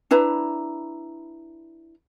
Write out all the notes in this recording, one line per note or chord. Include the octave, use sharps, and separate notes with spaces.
D4 E4 B4 A#5